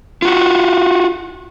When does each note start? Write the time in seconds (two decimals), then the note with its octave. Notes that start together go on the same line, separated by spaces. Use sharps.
0.22 F4 F#4